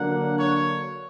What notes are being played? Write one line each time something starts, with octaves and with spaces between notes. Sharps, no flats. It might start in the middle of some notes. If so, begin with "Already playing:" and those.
Already playing: D3 F#3 A#3 D4 F#5
C#5